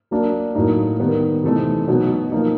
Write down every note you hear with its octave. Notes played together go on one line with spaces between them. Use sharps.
F#3 A#3 D4
A2 F#3 A#3 D#4
D#3 G3 B3
C3 E3 A3 C4 D#4
B2 F#3 B3 D#4
F3 A#3 D#4